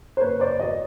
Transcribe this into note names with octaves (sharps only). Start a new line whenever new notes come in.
C5
F#1 B4 C#5
C5 D5
E2 B2 C#5 D#5